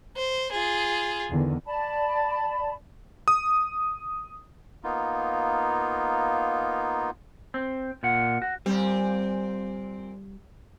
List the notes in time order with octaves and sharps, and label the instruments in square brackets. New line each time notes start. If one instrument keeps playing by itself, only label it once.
[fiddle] C5
F4 G#4
[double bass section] E2 D3 D#3
[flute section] D5 A5 B5
[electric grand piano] D#6
[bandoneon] A#3 B3 D#4 F4
[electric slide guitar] C4
A#2 F4 F#5
F#4
[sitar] A#2 C4 [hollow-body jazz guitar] G3